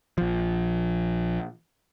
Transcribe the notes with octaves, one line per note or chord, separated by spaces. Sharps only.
A#1 F3